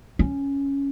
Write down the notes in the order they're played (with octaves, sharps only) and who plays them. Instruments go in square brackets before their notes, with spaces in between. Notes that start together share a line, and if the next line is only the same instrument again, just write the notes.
[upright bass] C#4